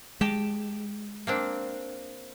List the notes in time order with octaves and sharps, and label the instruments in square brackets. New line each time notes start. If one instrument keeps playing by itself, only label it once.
[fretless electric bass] G#3 [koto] G4 G5 A5
[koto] A#3 C4 D4